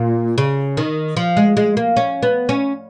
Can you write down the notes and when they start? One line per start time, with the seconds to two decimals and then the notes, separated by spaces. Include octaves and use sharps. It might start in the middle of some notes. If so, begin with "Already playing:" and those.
Already playing: A#2
0.38 C#3
0.77 D#3
1.17 F3
1.37 G#3
1.57 G#3
1.77 A#3
1.97 C#4
2.23 B3
2.49 C#4